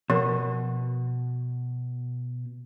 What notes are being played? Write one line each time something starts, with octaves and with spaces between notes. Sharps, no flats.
B2 F3 A#4